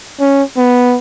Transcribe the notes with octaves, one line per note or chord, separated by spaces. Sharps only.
C#4
B3